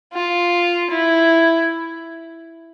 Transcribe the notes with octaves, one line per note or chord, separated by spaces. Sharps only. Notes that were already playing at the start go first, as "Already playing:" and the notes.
F4
E4